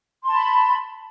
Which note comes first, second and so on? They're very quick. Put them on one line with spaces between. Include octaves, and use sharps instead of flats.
C6 A5 B5